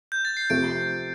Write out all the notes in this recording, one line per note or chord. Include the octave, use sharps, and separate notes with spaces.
G6
A6
C7
C3 F3 A3 D7